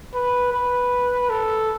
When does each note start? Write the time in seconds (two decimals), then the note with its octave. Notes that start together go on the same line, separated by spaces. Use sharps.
0.14 B4
0.53 B4
1.30 A4